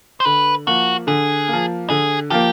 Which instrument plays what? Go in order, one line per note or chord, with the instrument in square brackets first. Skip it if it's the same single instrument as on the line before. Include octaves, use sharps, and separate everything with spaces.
[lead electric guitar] C5
[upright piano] D3 [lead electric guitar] B4
[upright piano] F3 A#3 [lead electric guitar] F#4
[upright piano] D3 [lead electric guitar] G#4
[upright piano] A#3
F3
[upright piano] D3 [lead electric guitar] G#4
[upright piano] F3 A#3 [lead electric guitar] G4